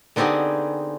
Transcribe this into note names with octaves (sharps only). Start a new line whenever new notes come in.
D3 B3 C4 D#4 G4 G#4